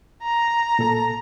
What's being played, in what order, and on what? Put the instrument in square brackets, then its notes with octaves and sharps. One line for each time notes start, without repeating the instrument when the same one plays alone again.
[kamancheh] A#5
[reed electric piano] A#2 A4 A5